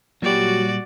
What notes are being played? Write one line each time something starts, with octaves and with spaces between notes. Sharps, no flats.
A#2 F#3 G3 F#4 D5